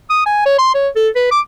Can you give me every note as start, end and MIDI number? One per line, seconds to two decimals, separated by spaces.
0.10 0.25 87
0.26 0.43 80
0.46 0.58 73
0.59 0.73 84
0.74 0.88 73
0.96 1.08 69
1.16 1.27 71
1.31 1.40 86